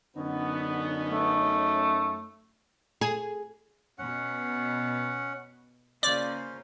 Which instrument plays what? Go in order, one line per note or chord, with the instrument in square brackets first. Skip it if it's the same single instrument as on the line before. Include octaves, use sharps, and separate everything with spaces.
[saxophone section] F#2 C#4 D#4 [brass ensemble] D3 B3
[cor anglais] A3
[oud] G#4
[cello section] B2 B3 [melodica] C#4 F#5
[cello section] C#3 A#3 F4 [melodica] C#4 C5 [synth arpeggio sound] D5